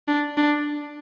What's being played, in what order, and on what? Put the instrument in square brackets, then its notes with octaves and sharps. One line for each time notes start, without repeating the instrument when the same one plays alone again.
[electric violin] D4
D4